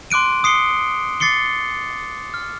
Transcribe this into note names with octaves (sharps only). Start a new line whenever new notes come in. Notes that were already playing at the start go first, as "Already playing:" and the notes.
C6 D6 F#6 D7 D#7
D#6 C7 C#7 G7
D6 A6 C7 C#7 G7
F6